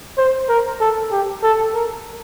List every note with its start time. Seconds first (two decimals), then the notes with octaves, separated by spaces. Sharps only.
0.18 C5
0.49 A#4
0.80 A4
1.12 G4
1.43 A4
1.74 A#4